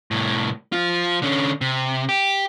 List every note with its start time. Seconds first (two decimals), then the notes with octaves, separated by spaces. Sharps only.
0.11 C2 A2
0.72 F3 F4
1.22 D3 C#4
1.61 C3
2.09 G4